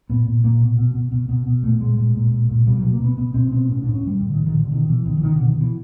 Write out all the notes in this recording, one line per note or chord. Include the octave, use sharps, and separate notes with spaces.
A#2 B3
A#2
A#2 A#3
B2
B2
B2
B2
B2
B2
A#2 A3
A#2 G#3
A#2 G#3
A#2
A#2
A#2
B2 G3
B2 F#3
A#3
B2 B3
B2 B3
B2 C4
B2 C4
A2 C#4
A2 D4
C#4
A2 G3
A2 D3
A2 D#3
D#3
A2 D3
B2 D#3
B2 E3
B2 D#3
E3
B2 D#3
B2 D3
D#3
B2 E3